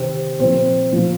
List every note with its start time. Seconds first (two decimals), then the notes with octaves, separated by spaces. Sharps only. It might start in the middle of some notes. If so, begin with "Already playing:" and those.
Already playing: C3 D#3 C4 C5
0.39 A#2 F3 C4 C5
0.93 A#2 F3